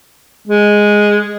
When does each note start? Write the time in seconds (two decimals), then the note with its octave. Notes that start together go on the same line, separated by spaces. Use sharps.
0.47 G#3